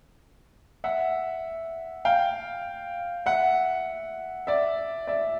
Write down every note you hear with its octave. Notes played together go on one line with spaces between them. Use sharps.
E5 F#5
F5 G5
E5 F#5
D5 E5
D5 E5